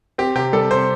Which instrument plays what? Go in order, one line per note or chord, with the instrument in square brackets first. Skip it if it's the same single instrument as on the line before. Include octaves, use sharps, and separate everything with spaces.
[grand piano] C4 G4
C3 G4
G3 A4
C3 C5